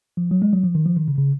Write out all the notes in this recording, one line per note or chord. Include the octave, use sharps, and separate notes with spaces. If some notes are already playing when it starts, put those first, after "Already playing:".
F3
F#3
G#3
F#3
F3
D#3
F3
D#3
C#3
C#3